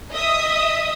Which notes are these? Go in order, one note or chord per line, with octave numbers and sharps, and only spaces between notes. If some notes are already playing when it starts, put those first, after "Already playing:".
D#5 E5 D#6